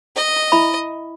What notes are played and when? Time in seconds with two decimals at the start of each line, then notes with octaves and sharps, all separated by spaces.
0.16 D#5
0.52 E4 E5 B5